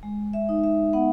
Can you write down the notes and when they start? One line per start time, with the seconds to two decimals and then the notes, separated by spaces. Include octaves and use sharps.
0.03 G#3
0.33 E5
0.49 D#4
0.64 E5
0.93 B3 F#5